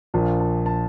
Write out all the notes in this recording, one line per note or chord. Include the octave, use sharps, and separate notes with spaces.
A#1 A#2 F3 A5
A5
A5